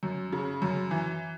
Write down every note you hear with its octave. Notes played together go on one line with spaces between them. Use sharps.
F#2
C#3
F#2
E3